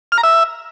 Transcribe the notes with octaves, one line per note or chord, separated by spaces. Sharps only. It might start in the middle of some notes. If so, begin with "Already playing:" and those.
F6
A#5
E5